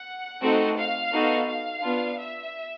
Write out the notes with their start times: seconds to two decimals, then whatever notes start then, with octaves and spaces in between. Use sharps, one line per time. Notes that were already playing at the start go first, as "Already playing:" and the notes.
Already playing: F#5
0.42 A3 C4 D#4 F#4 A4
0.77 F5
1.12 B3 D#4 F#4 A4
1.47 F5
1.82 B3 D4 F4
2.18 E5